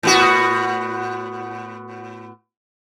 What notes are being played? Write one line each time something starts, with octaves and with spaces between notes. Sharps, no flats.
A2 B3 F#4